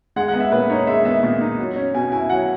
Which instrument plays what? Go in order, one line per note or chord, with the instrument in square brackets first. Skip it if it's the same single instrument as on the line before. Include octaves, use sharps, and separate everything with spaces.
[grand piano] G#3 F#5
F#5
B3
E5
A#2 B4
D#4 C#5
G#3 E5
B3 E5
A#2
D#4
F#3
C#4
B2 G#5
E4 G#5
F#3 F#5